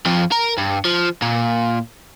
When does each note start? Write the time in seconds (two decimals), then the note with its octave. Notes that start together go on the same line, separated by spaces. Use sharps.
0.06 F2 F3
0.32 A#4
0.58 G2
0.85 F3
1.22 A#2